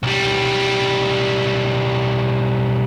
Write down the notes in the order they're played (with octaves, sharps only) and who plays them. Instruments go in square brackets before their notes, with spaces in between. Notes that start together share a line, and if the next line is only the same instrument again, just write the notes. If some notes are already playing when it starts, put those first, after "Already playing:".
[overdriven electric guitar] B1 G3